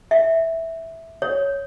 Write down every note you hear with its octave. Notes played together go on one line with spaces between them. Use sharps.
E5
C#5